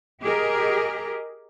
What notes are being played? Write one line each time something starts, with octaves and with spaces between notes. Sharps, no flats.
G4 G#4 A#4 D#5